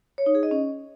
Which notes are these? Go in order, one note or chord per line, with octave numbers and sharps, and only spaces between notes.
C#5
D#4
G#4
D#5
C#4